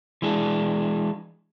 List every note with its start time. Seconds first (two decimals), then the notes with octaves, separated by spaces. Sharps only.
0.22 E3 G#3 D4